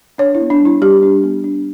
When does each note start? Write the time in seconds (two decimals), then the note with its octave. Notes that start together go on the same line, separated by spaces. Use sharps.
0.18 D4 C#5
0.35 E4
0.40 B3
0.50 D4
0.60 G3
0.65 E4
0.82 G3 G4
1.03 D4
1.24 B3
1.44 D4